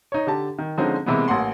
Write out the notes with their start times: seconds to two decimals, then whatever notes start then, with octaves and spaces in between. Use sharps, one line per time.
0.12 D#4 C#5
0.27 D3 G4 A5
0.58 D#3
0.78 D3 F3 G#3 C4 C#4 D#4
1.06 C3 E3 G#3 A#3 B3
1.28 A1 A#3 F#5 C6